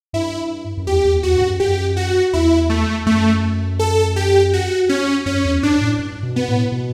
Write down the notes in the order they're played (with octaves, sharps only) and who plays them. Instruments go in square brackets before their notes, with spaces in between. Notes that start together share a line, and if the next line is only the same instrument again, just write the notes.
[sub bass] G2 [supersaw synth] E4
[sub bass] F#2
[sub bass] E2 [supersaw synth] G4
[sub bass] E2
[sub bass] E2 [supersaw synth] F#4
[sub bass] G2
F#2
[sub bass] F#2 [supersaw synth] G4
[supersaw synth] F#4
[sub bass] E2 [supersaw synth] E4
[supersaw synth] A3
[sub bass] F#2 [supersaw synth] A3
[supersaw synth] A4
G4
F#4
C#4
[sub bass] F#2 [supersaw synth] C#4
[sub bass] E2
[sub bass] G2 [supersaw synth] D4
[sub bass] A2
G2
B2
[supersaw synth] B3
[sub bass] A2
B2